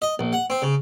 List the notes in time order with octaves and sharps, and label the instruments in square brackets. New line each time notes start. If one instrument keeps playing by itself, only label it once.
[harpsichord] D#5
A#1
F#5
C4
C#3